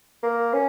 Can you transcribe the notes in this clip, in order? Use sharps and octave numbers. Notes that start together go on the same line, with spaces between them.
A#3
C#4